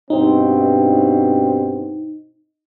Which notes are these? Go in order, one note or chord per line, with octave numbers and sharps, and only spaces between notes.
G2 B2 C4 D#4